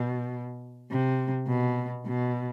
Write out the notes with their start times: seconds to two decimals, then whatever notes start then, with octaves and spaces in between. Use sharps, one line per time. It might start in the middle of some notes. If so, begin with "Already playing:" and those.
Already playing: B2
0.91 C3
1.48 B2
2.06 B2